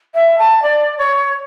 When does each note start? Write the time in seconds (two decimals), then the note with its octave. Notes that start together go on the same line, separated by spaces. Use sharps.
0.14 E5
0.38 A5
0.62 D5
0.98 C#5